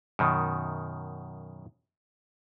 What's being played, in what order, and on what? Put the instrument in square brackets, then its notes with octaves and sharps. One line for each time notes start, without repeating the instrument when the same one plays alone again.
[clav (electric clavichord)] F#2 B2 D#3